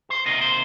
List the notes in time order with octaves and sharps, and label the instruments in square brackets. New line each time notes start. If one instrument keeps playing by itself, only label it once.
[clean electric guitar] C5
C3 D#3 A#3 D#5
C5